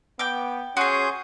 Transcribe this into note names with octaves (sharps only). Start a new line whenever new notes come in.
B3 G5 D6
C#4 F#4 G#4 C6 D#6 G6